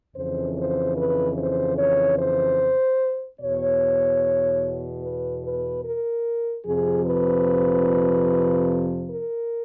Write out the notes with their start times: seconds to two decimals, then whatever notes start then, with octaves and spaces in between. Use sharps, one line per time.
0.16 F2 C#3 E3 C5
0.58 C5
0.97 B4
1.39 C5
1.79 C#5
2.19 C5
3.41 E2 B2 C#5
5.03 B4
5.44 B4
5.85 A#4
6.66 F2 C3 F3 G#4
7.06 B4
9.09 A#4